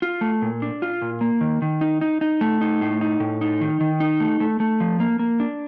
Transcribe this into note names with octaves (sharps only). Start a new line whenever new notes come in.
F4
A3
A#2
D4
F4
A#2
A#3
D#3
D#3
D#4
D#4
D#4
A3
D#4
A2
D#4
A2
D#4
D#3
D#3
D#4
A3
A3
A3
F3
A#3
A#3
D4